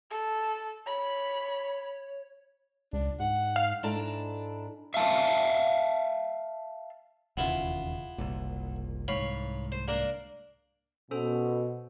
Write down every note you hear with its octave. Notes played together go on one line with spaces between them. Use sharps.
A4
C#5 B5
C#2 D4
G#2 F#5
F5
G#2 D4 E4 A4 A5 A#5
E5 F5 A5
E1 D#2 C#3 B3 E4 F4
F#1 C2 A#2
C2 G#2 C#5 F5 B5
C5
A#3 D4 A#4
B2 C#4 A4 C5